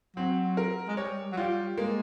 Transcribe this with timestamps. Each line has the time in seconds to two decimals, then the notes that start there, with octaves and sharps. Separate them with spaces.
0.16 F#3 C4
0.57 A#4
0.88 G#3
0.97 G3 C#5
1.32 F#3
1.37 G3 F4
1.78 G#3 A#3